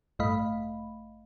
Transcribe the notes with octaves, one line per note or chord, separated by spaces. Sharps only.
A1 G2 A3 D#5 F5 B5